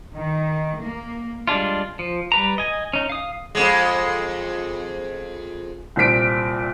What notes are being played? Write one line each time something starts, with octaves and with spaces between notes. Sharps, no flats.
D#3
A#3
G3 G#3 D4 F4
F3
G3 B4 A#5
D#5 G#5
C#4 D#4
F5 D#6
F2 G#3
C2 A#2 C4 B6 D7